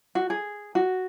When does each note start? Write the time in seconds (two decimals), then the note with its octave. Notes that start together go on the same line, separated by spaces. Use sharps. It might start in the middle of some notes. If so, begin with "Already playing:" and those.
0.15 F#4
0.30 G#4
0.75 F#4